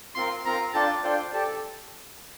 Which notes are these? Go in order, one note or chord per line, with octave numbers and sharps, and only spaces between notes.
C4 F4 A#4 F5 C6
C4 F4 A#4 F5 A#5
D4 F4 A4 D5 G5 A5
D4 F4 A4 C5 D5 G5
G4 A4 D5 A5